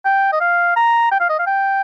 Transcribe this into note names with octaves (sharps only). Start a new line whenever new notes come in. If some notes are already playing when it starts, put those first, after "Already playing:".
G5
D#5
F5
A#5
G5
F5
D#5
F5
G5